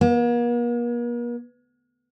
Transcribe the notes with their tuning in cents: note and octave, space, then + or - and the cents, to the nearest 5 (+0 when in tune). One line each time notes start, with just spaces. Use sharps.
A#3 +45